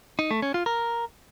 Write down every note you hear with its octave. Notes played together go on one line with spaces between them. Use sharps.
D#4
A3
C#4
F4
A#4